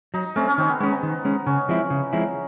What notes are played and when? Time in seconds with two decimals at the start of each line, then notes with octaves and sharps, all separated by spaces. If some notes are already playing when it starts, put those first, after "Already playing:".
0.14 F#3 D#4
0.36 A3 C4 C#4
0.47 C#4
0.58 D#3 C4
0.69 B3
0.80 G#3 B3 C#4
0.92 D#4
1.03 D#3
1.25 G#3 C#4
1.46 C#3 C#4
1.69 F3 G#3 C4 E4
1.90 C#3
2.13 F3 G#3 C4 E4